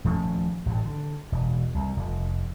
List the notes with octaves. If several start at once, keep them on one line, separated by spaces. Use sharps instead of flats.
D#1 F3 A3 C#4
A1 G2
D3
E1
C2
F1